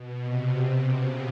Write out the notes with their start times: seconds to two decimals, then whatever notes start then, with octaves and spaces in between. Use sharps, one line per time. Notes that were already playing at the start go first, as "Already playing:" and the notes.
Already playing: B2
0.23 C3
0.55 B2
0.87 C#3